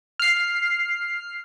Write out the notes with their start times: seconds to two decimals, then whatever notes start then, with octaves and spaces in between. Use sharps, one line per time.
0.19 F6 C7